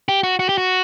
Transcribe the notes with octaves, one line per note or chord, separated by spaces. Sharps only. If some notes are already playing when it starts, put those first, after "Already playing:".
G4
F#4
F#4
G4
F#4